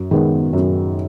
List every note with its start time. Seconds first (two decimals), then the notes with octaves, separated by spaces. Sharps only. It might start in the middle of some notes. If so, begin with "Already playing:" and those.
Already playing: F#2
0.11 D#3 G#3 B3
0.53 F#2